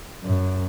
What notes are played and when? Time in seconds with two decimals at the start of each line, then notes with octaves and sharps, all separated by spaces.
0.24 F#2